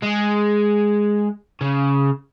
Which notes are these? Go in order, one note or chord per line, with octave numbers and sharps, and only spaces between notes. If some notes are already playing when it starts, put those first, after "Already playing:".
G#3
C#3